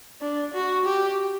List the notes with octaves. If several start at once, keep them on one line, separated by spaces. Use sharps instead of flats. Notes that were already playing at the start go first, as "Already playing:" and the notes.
D4
F#4
G4